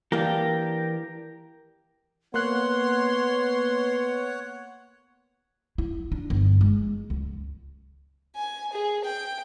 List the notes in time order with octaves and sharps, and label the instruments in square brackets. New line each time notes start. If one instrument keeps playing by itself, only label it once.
[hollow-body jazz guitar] E3 A#3 D4 [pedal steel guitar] G4 A#4 G5
[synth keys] A#3 F#6 [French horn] B3 [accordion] C#5 F#5 [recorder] C6
[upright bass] E4
D4
G1
G#3
C#2
[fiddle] G#5
G#4
G5